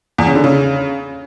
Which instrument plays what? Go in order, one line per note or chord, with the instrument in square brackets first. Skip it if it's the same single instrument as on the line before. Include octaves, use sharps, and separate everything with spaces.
[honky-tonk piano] E2
C#3
D3
C#3